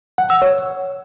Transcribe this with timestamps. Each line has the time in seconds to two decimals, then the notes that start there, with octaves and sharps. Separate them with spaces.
0.18 F#5
0.30 E6
0.42 C#5